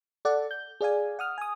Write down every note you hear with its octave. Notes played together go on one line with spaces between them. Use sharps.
A4 D5 F#5
G6
G#4 D5 F5 G#5
F#5 D#6 F6
G#5 D#6